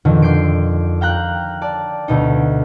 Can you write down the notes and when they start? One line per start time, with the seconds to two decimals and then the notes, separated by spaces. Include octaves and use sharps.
0.05 F2 B2 D3 D#3
0.22 D6 G6 C7 D7
1.01 F5 G5 A#5 F#6
1.62 D5 A5
2.08 D2 B2 D#4